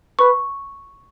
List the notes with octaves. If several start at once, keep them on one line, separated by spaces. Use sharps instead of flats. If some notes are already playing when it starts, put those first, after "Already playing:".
B4 C#6